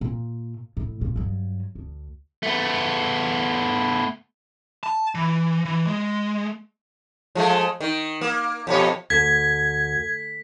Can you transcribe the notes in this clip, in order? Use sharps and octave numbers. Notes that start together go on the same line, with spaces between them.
A#2
A2
A#2
G2 F#3
D2
A3 B3
A5
E3
E3
G#3
F3 G#3 A3
D#3
A#3
F2 B2 C#5
D2 G#6 B6